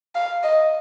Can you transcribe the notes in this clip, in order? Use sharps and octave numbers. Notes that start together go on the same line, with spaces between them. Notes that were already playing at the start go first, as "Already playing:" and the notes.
F5
D#5